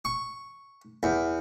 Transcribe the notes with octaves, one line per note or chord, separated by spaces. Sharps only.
C#6
E2